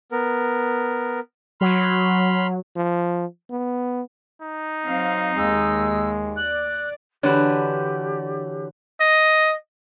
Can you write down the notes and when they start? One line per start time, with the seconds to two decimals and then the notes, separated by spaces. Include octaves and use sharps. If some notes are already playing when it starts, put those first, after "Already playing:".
0.12 B3 A#4
1.61 F#3 B5 C6 F6
2.76 F3
3.51 B3
4.42 D#4
4.84 F#3 C4 F5
5.37 D#2 G#3 E6
6.36 D5 F#6
7.23 D3 E3 D4 F#4 G4 B4 C#5
9.00 D#5